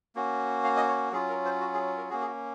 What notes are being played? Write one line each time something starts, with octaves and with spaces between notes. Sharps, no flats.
A#3 C#4 F#4
F5
D#5
C#5
F#3 C#4 F4 G#4
A#4
C5
F#4
G#4
A#4
A#3 C#4 F#4 G#4
G#4
F#4